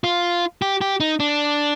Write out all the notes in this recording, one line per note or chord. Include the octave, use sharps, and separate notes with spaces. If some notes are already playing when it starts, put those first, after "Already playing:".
F4
G4
G4
D#4
D4